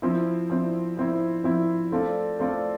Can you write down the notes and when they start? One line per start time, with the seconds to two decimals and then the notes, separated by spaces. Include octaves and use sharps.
0.02 F3 C4 E4
0.50 F3 C4 E4
0.97 F3 C4 E4
1.44 F3 C4 E4
1.92 A3 C4 F4 A4 D5
2.39 A3 C4 F4 A4 D5